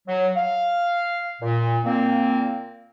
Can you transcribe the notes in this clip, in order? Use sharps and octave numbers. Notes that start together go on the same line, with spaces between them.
F#3
F5
A#2
A#2 A#3 C4